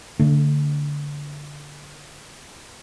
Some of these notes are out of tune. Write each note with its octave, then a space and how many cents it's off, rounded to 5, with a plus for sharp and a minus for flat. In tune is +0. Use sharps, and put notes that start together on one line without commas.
D3 -15 A3 +30 D4 +0